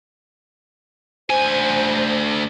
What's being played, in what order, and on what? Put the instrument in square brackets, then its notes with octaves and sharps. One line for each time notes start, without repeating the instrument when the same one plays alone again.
[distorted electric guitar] D2 G#5 [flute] C5